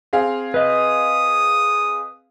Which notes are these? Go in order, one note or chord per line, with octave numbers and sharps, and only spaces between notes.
C4 G#4 F5
B4 D#5 D#6